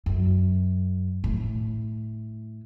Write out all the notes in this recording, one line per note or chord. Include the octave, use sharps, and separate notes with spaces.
F#2
A2